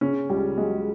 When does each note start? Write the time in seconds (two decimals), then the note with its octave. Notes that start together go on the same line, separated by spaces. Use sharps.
0.01 C#3 C#4
0.30 C#2 G3
0.57 F#3 G#3